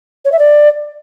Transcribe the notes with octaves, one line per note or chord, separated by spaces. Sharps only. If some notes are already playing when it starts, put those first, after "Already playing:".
C#5
E5
D5